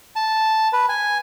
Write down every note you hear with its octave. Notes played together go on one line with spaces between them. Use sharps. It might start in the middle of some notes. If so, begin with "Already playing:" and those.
A5
B4
G#5